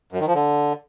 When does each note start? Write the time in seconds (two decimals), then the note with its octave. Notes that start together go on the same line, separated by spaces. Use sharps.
0.12 F#2
0.20 D#3
0.27 F3
0.35 D3